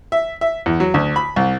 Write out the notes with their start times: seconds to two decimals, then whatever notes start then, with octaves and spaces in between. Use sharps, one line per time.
0.12 E5
0.41 E5
0.66 E2
0.80 F#3
0.94 D2
1.16 B5
1.36 C2